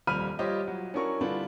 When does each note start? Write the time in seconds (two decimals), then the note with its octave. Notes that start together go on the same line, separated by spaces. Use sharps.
0.07 D#1 F2 G3 B5 F6 D#7
0.39 G3 F4 G4 C5 C#5 D#5
0.67 F#3
0.94 C#4 D4 E4 F#4 A#4 C#6
1.21 D3 G3 D4 E4 F4 B4